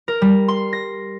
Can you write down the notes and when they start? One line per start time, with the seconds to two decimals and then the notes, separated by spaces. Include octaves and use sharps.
0.08 A#4
0.22 G3
0.48 C6
0.73 A#6